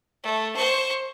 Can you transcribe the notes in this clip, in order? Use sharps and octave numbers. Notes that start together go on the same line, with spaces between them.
A3
C5 C#6